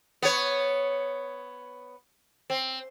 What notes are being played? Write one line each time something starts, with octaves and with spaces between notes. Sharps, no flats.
B3 C#5
C4